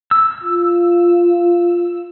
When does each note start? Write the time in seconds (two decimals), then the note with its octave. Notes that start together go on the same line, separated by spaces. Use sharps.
0.11 E6
0.43 F4